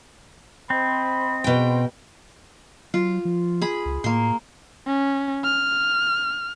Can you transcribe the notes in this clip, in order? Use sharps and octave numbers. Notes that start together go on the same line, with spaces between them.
C4 C5 D#5 B5
B2 B4 G5
F#3 F4
F3
G#4 B5
C#2
A2 A#3 C6
C#4
F6